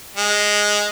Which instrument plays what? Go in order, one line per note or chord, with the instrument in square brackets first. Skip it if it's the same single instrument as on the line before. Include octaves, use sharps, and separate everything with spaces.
[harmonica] G#3